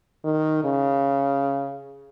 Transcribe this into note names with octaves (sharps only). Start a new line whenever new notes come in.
D#3
C#3